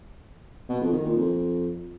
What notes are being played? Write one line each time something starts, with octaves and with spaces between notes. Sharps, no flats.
B2
F2
D#3
A#2
F2